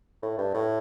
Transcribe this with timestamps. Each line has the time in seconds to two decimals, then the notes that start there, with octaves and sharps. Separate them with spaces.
0.22 A2
0.38 G2
0.54 A2